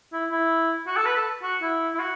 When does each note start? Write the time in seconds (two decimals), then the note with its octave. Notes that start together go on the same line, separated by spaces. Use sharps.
0.12 E4
0.31 E4
0.87 F#4
0.97 A4
1.06 B4
1.16 A4
1.43 F#4
1.62 E4
1.95 E4
1.99 F#4